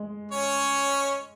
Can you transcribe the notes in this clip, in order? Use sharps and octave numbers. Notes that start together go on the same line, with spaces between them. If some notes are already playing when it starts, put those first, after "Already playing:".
Already playing: G#3
C#4 C#5